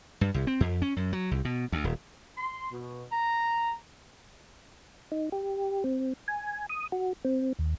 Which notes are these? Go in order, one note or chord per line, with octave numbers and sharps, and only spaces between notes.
G2
C2
C4
F2
C#4
F#2
F#3
C2
B2
D2
D#1
C6
B2
A#5
D#4
G4
C4
G#5
D#6
F#4
C4
D#2